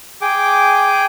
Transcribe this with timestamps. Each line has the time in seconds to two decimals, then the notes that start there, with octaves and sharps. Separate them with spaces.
0.22 G#4 G5 D6